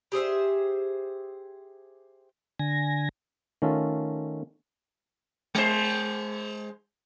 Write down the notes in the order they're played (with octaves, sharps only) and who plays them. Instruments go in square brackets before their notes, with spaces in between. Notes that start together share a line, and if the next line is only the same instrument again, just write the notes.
[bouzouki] G4 G#4 C5 E5
[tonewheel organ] D3 G#5 A#6
[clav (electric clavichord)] D#3 A3 C#4 F4 A4
[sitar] G#3 C5